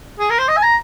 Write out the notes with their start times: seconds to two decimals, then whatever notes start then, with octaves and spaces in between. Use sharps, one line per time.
0.19 G#4
0.30 A#4
0.39 C5
0.48 D#5
0.57 G#5
0.63 A#5